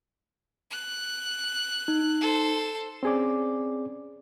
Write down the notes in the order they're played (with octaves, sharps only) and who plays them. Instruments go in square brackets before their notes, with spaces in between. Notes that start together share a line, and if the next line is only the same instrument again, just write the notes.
[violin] F#6
[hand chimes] D#4
[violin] A4 C5
[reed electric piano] C4 C#4 G#4 D5 D6